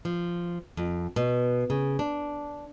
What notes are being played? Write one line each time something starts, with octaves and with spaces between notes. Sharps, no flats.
F3
F2
B2
C#3
D4